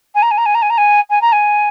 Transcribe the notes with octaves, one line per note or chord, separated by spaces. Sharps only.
G#5
A#5
G#5
A#5
G#5
A#5
G#5
A#5
G#5
G#5
A#5
G#5